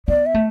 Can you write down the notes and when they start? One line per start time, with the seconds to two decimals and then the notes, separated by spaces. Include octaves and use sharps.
0.08 B3 D5
0.26 E5
0.34 A3